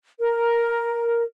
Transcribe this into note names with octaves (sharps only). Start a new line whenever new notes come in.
A#4